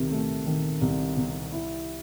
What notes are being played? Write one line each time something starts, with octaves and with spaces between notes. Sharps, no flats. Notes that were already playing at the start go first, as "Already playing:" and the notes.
Already playing: C2 C3 D#3
A3
D#3
C2
C3
E4